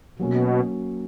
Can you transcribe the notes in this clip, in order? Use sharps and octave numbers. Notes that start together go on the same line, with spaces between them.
B2 F#3 A#3 C#4 F#4